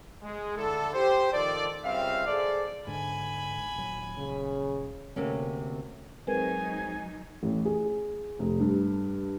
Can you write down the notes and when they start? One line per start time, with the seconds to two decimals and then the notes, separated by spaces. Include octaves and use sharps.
0.23 G#3
0.57 D3 D4 E4 A4
0.94 G4 C5
1.32 D#3 F3 A4 D5
1.85 C#2 G3 C4 E5 F5
2.27 G#4 A4 C5 D5
2.87 G#2 D3 G#5 B5
3.76 D#1 F#3
4.18 C#3
5.16 D2 C3 A#3 C#4
6.27 F#3 G#3 C4 D#4 A#4 B4 G#5
7.43 A1
7.65 G#4
8.39 F1
8.60 G2